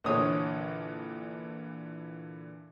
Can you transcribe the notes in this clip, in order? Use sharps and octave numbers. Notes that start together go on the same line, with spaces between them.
A#1 A#2 D3 E3 C5 C#5 D#6